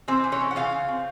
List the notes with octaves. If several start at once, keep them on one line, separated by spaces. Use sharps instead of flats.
E3 C4 C5
E3
C#4 C#5
E3
F#5
C#3 F4 F5
C#3
C4